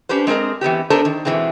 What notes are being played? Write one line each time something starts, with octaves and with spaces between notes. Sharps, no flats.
C#4 D4 G4 B4 C5
G#3 C4 G#4 A#4 D#5
E3 B3 C4 G4
B3 D4 A4 A#4 C5
D#3
E2 G#2 B2 E3 G#3 C4